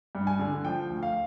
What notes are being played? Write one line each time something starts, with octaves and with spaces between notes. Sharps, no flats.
G2
G#5
D3
F3 G5
D2
F5